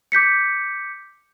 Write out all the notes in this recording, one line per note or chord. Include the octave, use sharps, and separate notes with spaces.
D6 G6 B6 C#7